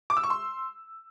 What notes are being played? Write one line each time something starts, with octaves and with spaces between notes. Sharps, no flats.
D6
E6
C#6
C6